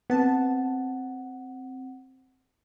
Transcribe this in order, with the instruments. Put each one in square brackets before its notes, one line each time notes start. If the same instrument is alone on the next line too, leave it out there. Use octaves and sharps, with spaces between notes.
[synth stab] B3 A5 [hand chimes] C4 F#5